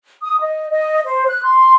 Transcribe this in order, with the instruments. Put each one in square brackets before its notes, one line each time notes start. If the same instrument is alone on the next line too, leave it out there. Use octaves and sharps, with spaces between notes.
[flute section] D#6
D#5
D#5
C5
F#6
C6